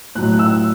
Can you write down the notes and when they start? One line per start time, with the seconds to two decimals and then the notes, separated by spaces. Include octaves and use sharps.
0.15 A2 F#3 F#6
0.33 F#6
0.39 E6